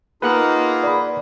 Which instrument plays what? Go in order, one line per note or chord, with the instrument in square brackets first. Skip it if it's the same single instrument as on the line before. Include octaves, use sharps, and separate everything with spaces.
[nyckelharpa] A#3 [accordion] D#4 F4 G#4 [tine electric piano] B4 F#5 F#6
[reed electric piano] D5 B5